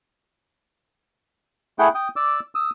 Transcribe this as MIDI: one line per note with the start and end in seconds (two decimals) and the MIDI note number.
1.79 1.88 57
1.79 1.88 64
1.79 1.88 68
1.79 1.88 78
1.79 1.88 79
1.95 2.08 79
1.95 2.08 87
2.16 2.40 74
2.16 2.40 86
2.16 2.40 88
2.55 2.70 87
2.55 2.70 88